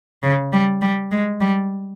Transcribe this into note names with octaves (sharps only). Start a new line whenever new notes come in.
C#3
G3
G3
G#3
G3